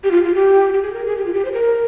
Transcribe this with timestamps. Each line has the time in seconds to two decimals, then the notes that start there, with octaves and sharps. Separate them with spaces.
0.04 G4
0.11 F4
0.23 F4
0.34 G4
0.74 G4
0.82 G#4
0.93 A#4
1.06 G#4
1.17 G4
1.26 F4
1.33 G4
1.45 C5
1.52 A#4